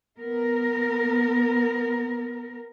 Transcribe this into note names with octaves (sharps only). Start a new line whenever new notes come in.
B3 A#4